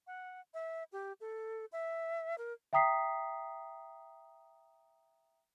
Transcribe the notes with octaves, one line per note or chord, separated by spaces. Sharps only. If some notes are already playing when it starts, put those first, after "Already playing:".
F#5
E5
G4
A4
E5
A#4
E5 G5 A#5 D#6 B6 C7